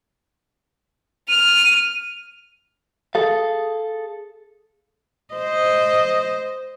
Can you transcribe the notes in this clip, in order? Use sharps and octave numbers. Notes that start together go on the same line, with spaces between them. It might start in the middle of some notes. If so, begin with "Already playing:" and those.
F6 D#7
G#4 A4 F5
C5 D#5